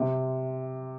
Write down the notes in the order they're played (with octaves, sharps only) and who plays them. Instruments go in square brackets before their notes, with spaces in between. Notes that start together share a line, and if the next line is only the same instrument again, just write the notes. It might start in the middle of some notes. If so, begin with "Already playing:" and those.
Already playing: [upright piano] C3